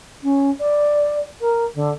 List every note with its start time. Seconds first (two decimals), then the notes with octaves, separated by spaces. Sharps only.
0.23 C#4
0.59 D5
1.41 A#4
1.75 D3